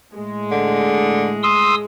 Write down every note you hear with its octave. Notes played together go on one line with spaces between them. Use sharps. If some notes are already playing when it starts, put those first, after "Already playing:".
A2 G#3
D3
C6 D#6 E6